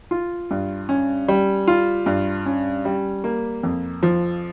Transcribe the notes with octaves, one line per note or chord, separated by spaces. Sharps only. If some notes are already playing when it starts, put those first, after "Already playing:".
F4
G2
C#4
G3
F4
G2
C#4
G3
A#3
F2
F3